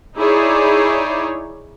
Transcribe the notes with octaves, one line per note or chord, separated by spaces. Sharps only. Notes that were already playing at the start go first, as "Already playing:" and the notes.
D#4 E4 G#4 C#5 D5